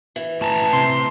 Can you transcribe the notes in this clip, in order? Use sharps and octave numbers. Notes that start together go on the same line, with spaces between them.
E3
A2 A5 A#5
C3 C6